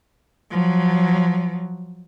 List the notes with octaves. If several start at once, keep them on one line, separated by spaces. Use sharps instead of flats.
F3 F#3